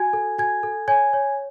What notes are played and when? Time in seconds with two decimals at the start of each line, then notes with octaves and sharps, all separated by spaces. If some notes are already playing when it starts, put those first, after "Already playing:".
Already playing: F#4 G#5 G#6
0.13 A4
0.38 F#4 G#5 G#6
0.63 A4
0.88 C#5 G#5 G#6
1.13 C#5